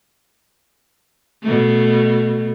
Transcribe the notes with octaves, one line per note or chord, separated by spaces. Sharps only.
B2 A3